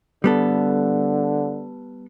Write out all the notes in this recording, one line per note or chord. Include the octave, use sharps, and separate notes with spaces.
D3 G3 B3 A4